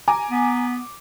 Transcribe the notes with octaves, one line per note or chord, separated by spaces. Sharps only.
G#5 A#5 D6
B3